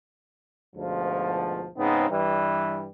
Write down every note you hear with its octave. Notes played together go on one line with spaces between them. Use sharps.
D2 G#2 B2 F3
G#2 C#3 B3 C4 D#4
G2 E3 G3